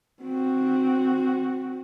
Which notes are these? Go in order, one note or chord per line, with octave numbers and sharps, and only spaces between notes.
C4 F#4